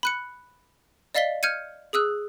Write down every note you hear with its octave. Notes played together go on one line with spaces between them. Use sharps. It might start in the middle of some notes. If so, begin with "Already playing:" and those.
B5 F#6 C#7
D5 D#5 F5 A6 B6 G7
F6 G6 G#6 C#7 D#7
G#4 D#6 E6 F#6